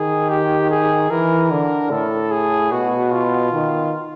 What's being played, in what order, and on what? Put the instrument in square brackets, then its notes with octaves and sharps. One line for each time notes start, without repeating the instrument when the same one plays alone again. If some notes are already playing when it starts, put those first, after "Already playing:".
Already playing: [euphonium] D#3 [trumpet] G#4
[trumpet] G4
G#4
[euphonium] E3 [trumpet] A#4
[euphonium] D3
[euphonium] A2 [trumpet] A4
[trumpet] G#4
[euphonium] B2 [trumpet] F#4
[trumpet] F4
[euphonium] D#3